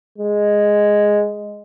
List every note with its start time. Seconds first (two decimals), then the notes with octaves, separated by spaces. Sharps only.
0.18 G#3